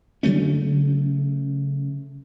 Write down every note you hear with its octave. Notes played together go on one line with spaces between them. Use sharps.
C#3 F#3 A3 C#4